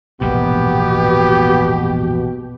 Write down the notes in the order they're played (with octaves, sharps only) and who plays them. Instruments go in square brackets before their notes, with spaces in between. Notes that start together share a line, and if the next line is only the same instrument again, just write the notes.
[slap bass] E1 A#1 G#2 [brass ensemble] B2 [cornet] B3 [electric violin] G4